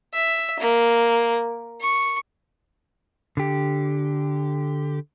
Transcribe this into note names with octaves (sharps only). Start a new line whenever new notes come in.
E5
A#3
C#6
D3 G4